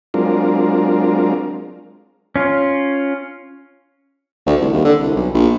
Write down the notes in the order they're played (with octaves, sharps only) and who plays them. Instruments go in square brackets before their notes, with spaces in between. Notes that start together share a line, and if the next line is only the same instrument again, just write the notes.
[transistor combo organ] F#3 G#3 C4 D4 F4 A#4
[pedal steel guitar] C#4 F4
[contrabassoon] D2
C2
D#2
D3
C2
B1
A#1